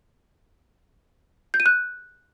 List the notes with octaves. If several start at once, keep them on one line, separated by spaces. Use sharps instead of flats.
G6
D#7
F#6